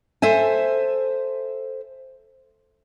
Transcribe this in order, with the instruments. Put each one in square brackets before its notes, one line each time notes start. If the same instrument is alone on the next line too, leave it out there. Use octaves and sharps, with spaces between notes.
[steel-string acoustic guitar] A4 C5 E5 G#5